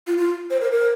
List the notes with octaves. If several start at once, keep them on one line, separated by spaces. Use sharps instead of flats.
F4
F4
C5
A#4
A#4